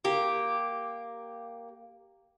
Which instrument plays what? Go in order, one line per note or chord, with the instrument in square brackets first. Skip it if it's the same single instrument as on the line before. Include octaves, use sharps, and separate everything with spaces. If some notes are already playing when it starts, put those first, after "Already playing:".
[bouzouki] A#3 G4